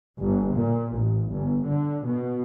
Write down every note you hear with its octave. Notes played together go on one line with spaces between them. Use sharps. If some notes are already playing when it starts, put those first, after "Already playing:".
G1
A#2
A1
G1
D3
B2